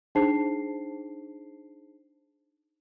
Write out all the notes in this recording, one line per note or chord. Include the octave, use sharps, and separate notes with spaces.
D4 D#4 G#4 C5 A5 C7